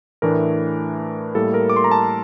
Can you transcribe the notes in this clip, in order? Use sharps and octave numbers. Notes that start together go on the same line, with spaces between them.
A2 E3 A3 D4 A#4
A2 G3 A#3 A4
A#4
D6
C6
A#5
A5